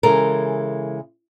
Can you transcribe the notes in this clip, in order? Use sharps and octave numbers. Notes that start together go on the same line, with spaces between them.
C#3 E3 G#3 A4 A#4